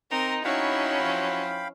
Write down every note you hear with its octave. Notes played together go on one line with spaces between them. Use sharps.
C4 D#4 A#4 D#5
F#3 C#4 D#4 E4 F5 G5 B5
F3